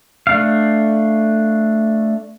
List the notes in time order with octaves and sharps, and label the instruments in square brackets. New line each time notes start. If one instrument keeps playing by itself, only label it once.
[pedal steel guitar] A3 D4 F5